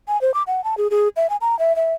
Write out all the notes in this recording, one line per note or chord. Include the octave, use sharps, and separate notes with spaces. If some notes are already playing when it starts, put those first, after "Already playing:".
G#5
C5
D6
F#5
A5
G#4
G#4
E5
G#5
A#5
E5
E5